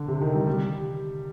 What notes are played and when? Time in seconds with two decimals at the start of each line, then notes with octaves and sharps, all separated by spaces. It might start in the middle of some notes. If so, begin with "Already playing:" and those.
Already playing: D3
0.08 C3
0.21 D#3
0.35 G3
0.47 G3